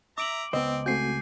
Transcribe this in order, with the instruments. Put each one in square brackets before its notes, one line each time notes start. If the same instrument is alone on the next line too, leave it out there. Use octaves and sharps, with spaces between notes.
[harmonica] E5 A#5 [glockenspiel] D6 D7 F#7
[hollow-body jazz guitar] C#2 C5 [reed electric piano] B3 D#5 [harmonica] C4
[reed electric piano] A3 C4 F#4 [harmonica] G#5 [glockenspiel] G6 C7